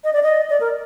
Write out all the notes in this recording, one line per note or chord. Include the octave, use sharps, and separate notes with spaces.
D#5
D5
D#5
D5
A#4